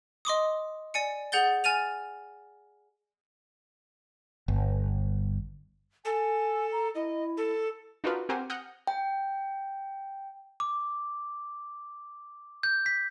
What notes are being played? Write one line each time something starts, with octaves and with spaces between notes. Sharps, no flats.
D#5 C6 D6 D#6
D5 G#5 C#7
G#4 F#5 G6 A6 G7
G#5 F6 A6 D#7 F7
G1
A4 G#5
A#5
E4 D#5
A4
D4 D#4 F4 F#4 A#4 B4
C4 G4 A#4 C5 F#5 G#5
F#5 D#6 F6 G6 A#6
G5
D6
G6
B6